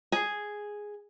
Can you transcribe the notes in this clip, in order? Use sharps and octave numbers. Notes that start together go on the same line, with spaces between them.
G#4